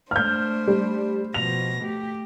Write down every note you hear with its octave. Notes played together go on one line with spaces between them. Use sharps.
A3 D4 C5 F6 G6
G3
B2 F3 A#6 F7
A3 G4